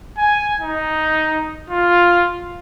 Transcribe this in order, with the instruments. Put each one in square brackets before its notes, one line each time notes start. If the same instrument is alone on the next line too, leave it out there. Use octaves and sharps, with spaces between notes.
[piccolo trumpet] G#5
D#4
F4